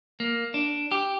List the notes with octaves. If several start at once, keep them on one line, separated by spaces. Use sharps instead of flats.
A#3
D4
G4